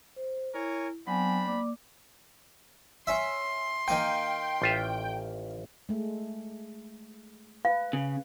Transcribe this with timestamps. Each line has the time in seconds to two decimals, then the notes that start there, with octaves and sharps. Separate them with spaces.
0.16 C5
0.54 E4 A#4 C#5 G#5
1.07 F#3 B3 C4 D4 G#5 B5
1.46 A#3 D5 D6
3.07 C#4 E5 C6
3.88 D#3 A#3 G5 G#5
4.62 A1 F4 E5
5.89 G#3 A3
7.65 B4 F5
7.93 C#3